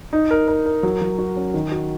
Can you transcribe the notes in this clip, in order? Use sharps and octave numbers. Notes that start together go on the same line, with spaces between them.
D#4
A#4
A#4
A#4
F#3
F#3
F#4
C#4
D#3
F#4